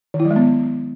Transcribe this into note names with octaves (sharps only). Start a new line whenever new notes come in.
D#3
E4
F#3
G#3
B3